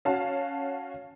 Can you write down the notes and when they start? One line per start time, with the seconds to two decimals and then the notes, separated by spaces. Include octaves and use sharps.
0.05 C#4 F#4 F5 A5